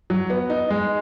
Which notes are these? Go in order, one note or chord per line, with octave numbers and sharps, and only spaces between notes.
F#3
B3
D#4
G#3